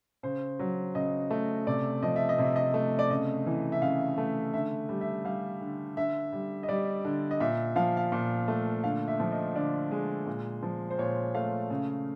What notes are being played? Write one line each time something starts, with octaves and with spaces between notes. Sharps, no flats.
C#3 C5
F#3
C#3 D#5
A3
C3 D5
F3 D#5
E5
D#5
C3 E5
D#5
A3
D5
C#3 D#5
E3
E5
C#3 F5
A3
D3 E5
G3
E5
G3 F5
D3
D3 E5
G3
D#5
G3 D5
D3
D#5
A#2 E5
F3 F5
F5
A#2
A3
D3 F5
E5
F3
D#5
D3 D5
G#3
A#2
F3
C5
A#2 C#5
A3 F5
C#3